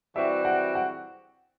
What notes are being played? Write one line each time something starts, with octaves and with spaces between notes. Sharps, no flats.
E3 G3 C4 F#4 E5
F#5
F#5